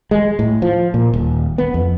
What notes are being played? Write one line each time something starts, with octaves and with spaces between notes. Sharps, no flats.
G#3
A2
F3
A#2
D#1
B3
F2